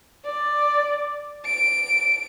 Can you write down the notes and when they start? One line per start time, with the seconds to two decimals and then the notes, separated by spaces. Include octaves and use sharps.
0.25 D5
1.45 D7